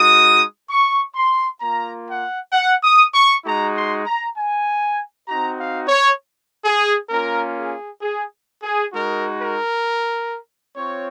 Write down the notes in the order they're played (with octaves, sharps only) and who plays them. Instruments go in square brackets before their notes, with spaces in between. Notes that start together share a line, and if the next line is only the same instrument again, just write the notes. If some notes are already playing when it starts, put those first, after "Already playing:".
Already playing: [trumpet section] G#3 D#4 F#4 D#6
C#6
C6
A#3 F4 A#5
F#5
F#5
D#6
C#6
G#3 D#4 F#4 A#5
C6
A#5
G#5
C4 D#4 F#4 A#5
F5
C#5
G#4
A#3 C#4 F4 A#4
G#4
G#4
G#4
G#3 D#4 F#4 A#4
A#4
C4 F4 C#5